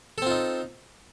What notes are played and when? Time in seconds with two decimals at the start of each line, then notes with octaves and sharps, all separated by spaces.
0.18 A4
0.22 C4
0.26 F4
0.31 D#4